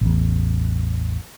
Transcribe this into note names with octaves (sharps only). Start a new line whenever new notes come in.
A1 E2